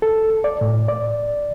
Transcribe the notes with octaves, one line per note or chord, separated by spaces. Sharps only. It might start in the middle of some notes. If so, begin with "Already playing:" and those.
A4
D5
A2
D5